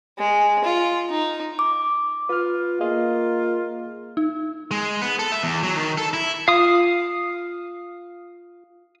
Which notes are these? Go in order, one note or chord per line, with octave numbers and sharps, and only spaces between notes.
G#3
F4
D#4
D6
F4 B4 F6
A#3 F4 G#4 D#5 F5
D#4
G#3
B3
A4
E5
E2
F#3
D#3
A4
E4
F4 F5 D#6